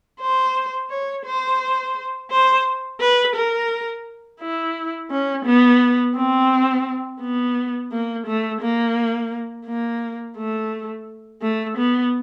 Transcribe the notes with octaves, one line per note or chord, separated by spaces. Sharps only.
C5
C#5
C5
C5
B4
A#4
E4
C#4
B3
C4
B3
A#3
A3
A#3
A#3
A3
A3
B3